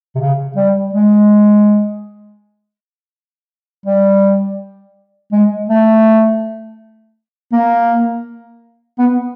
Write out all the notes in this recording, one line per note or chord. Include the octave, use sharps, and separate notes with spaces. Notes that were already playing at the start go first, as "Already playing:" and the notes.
C3
C#3
G3
G#3
G3
G#3
A3
A#3
B3